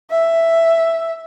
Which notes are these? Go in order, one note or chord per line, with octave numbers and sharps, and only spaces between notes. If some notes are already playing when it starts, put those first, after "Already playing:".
E5